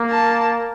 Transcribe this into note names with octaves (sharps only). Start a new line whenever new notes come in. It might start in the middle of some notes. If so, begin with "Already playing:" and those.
Already playing: A#3
A5